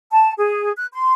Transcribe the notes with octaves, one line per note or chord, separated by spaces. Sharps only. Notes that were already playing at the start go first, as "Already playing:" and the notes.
A5
G#4
F#6
C6